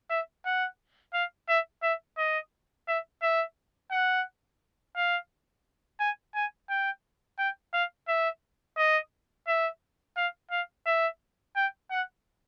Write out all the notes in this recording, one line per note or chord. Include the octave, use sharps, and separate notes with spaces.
E5
F#5
F5
E5
E5
D#5
E5
E5
F#5
F5
G#5
G#5
G5
G5
F5
E5
D#5
E5
F5
F5
E5
G5
F#5